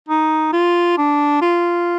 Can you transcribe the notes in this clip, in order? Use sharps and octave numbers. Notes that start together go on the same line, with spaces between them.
D#4
F4
D4
F4